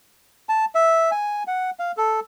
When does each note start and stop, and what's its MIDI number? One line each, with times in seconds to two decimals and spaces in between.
0.49 0.65 81
0.75 1.11 76
1.12 1.43 80
1.47 1.70 78
1.79 1.92 77
1.97 2.20 69